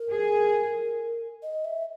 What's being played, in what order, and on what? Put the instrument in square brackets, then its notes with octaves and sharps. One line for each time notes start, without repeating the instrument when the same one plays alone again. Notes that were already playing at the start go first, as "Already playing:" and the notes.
Already playing: [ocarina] A#4
[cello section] G#4
[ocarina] D#5
E5